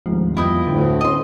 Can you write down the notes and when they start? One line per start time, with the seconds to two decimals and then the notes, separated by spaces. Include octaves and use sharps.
0.06 D#1 D2 G#2 F3
0.37 F2 G3 B3 E4 F4 D#5 G5
0.67 D2 A2 D3
0.78 D#6
1.01 C#4 A4 D#5 C6